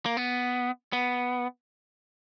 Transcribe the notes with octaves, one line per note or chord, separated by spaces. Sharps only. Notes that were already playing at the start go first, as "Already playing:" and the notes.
A#3
B3
B3